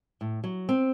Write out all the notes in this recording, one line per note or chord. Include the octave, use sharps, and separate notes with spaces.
A2
F#3
C4